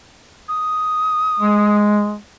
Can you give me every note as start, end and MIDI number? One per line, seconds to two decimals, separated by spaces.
0.49 1.76 87
1.40 2.17 56